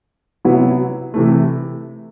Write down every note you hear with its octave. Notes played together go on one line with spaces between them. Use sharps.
C3 F#3 B3 E4
C3 E3 A3